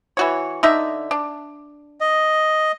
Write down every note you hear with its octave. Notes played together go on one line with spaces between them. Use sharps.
E3 F#4 C#5
D3 D#4 E5
D4
D#5